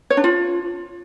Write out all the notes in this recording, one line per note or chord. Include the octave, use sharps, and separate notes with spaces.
C#5
D4
F4